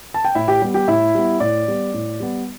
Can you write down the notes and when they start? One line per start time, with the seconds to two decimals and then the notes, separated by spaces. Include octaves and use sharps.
0.14 A5
0.25 G5
0.35 A2 E4 E5
0.48 G4 G5
0.62 G3 B3
0.74 G4 G5
0.88 A2 E4 E5
1.15 G3 B3
1.40 A2 D5
1.68 G3 B3
1.94 A2
2.20 G3 B3